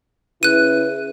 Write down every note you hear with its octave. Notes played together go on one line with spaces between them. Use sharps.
C#3 E4 B4 F#6 D#7